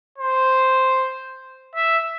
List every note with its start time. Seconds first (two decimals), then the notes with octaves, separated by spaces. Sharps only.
0.18 C5
1.75 E5